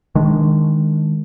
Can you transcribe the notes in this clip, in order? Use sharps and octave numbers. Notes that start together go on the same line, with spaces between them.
D#3 G#3 D4